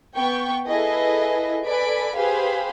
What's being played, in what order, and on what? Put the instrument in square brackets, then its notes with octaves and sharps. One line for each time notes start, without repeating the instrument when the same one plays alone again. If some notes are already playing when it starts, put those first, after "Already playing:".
[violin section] B3 G5 C#6
E4 G#4 A4 B4 D#5
A4 B4 D5 G#5 B5 D7
G4 G#4 B4 C5 F5 B5